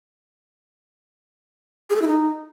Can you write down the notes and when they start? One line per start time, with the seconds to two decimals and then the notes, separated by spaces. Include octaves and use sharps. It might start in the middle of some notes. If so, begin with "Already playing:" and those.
1.90 G#4
1.96 A4
2.02 E4
2.07 D#4